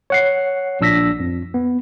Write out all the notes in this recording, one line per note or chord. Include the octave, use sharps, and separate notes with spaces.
C#5 F#5 C7
A#1 D4 E6 A#6 B6
F2
B3